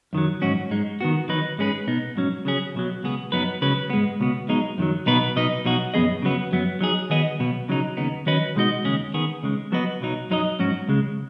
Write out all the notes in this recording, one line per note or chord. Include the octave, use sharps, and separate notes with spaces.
F#2 D#3 F#3
G#2 F#3 C#4 F#4
G#2 G#3 D#4
D#3 B3 F#4
D#3 F#3 D#4 B4
G#2 G#3 C#4 G#4 B4
B2 B3 D#4
G#2 F#3 C#4
C#3 F#3 C#4 G#4
B1 B2 F#3
C#2 B2 B3 G#4
F#2 F#3 B3 D#4 B4
C#2 C#3 F#3 C#4 B4
G#2 G#3 B3
C#2 B2 B3
B1 B2 G#3 D#4
F#2 D#3 F#3
B1 B2 B3 D#4 B4
B2 F#3 D#4 B4 D#5
B1 B2 F#3 D#4 F#4
F#2 D#3 B3 G#4 D#5
C#3 F#3 B3
F#2 F#3 B3
F#3 D#4 G#4
D#3 F#3 B3 G#4 D#5
B1 B2 B3
C#3 F#3 D#4
D#2 C#3 B3 D#4
D#3 F#3 C#4 B4 D#5
B2 G#3 D#4 F#4 D#5
D#2 C#3 G#3 C#4 G#4
D#3 B3 G#4
C#2 C#3 G#3
F#3 B3 F#4 B4 D#5
B1 B2 F#3 D#4
F#2 F#3 D#4 B4 D#5
G#2 F#3 C#4 F#4
C#2 C#3 G#3